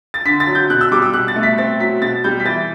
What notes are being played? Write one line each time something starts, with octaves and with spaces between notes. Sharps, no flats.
A6
D3 B6
A6
F#3
G6
B2 F#6
E6
G3 D6
E6
B2 F#6
A6
A3
B6
C4 A6
F#3 B6
B2 A6
G3 G6
B6
E3 A6